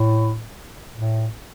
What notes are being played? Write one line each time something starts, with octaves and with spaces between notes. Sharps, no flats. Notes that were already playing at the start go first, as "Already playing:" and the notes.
Already playing: A2
A2